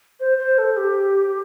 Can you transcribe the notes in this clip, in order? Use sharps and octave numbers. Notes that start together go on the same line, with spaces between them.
C5
C5
A4
G4